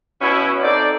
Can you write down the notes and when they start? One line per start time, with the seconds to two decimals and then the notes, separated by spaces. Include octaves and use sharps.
0.22 B2 C#4 E4
0.62 C4 D#4 A4 D5